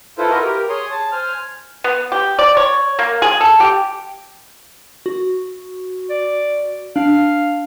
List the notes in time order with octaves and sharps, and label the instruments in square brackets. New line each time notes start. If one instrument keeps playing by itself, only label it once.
[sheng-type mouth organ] E4 F4 A4 B4 C5
F#4 A#4 B4 D#5 E5
G4 A#4
G#4 C#5 C6 D#6
A5
C5 G#5 F6
[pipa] B3
G4
D5
C#5
A#3
G#4
A4
G4
[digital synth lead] F#4
[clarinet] D5
[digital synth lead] D4 [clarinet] F5